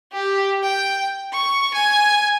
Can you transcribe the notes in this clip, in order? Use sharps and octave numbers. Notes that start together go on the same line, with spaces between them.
G4
G5
C#6
G#5